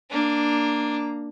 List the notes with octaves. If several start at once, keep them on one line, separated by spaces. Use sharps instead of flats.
A#3 D4 A#5